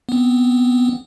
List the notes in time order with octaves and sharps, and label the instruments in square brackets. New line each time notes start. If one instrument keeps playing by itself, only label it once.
[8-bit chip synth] B3 C4